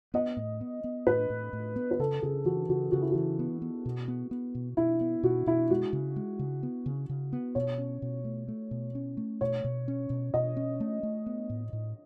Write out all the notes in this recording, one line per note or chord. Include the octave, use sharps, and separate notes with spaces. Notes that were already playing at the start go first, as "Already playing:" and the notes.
B3 D#5
A2
B3
B3
A2 B4
A2
A2
B3
B4
C#3 A4
C#3 G#4
E3 F#4
C#3 F#4
C#3 F#4
E4
E3 F#4
B3
B3
B2
B3
B3
B2
B2 E4
B3
B2 F#4
B2 E4
G#3 F#4
C#3
G#3
C#3
B3
C#3
C#3
B3
B2 C#5
C#4
B2
A3
A3
B2
C#4
A3
B2 C#5
B2
C#4
B2
B2 D#5
C#4
A3
A3
B3
A2
A2